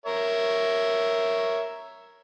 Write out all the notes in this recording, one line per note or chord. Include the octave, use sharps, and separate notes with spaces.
A#4 C#5 E5